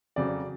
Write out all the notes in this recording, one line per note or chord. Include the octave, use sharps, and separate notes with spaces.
F2 C#3 F#3 D5